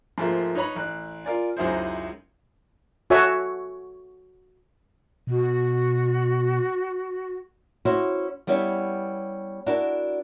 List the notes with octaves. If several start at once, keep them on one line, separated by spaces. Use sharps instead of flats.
G#2 F3 A3 A#3
D#4 B4 C#5 A#5 B5
A1 F#6
F4 A#4 D5 G#5
C#2 F#2 D#4 E4 G#4 C5
F#4 A4 C#5 E5 G#5
B2 F#4
C#4 E4 F#4 C5
G3 B3 C#4 E4 F#4 G4
D4 E4 F#4 A#4